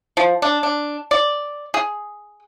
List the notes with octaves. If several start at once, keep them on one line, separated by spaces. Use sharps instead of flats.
F3
D4
D4
D5
G#4